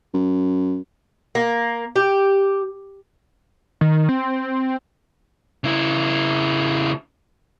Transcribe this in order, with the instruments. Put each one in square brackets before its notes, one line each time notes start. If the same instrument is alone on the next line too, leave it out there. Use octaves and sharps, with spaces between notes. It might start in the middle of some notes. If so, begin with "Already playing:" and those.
[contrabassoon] F#2
[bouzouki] A#3
G4
[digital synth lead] D#3
C4
[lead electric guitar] C#3 E4